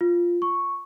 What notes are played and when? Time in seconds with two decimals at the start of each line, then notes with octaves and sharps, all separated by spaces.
0.01 F4
0.42 C#6